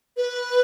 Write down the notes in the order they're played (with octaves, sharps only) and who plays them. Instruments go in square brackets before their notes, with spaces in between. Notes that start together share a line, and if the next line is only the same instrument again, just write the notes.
[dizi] B4